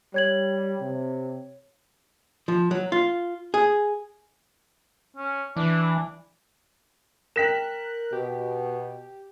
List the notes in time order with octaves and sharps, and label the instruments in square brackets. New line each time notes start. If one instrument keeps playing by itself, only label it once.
[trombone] G3 [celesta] C#5 G#6 F#7
[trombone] C3
[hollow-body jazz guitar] F3
F#3
F4
G#4
[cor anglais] C#4
[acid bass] E3 [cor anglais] D4
[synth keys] A#4 F#6 [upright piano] G5 B6 E7
[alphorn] B2 [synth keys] G4